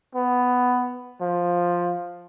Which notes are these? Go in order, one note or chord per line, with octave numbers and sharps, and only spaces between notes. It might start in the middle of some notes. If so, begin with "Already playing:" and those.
B3
F3